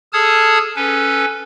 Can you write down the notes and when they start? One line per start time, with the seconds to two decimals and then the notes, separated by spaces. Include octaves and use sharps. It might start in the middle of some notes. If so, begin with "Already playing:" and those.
0.13 G#4 A4 A5 D#6 F6 G#6
0.76 C#4 A4 B4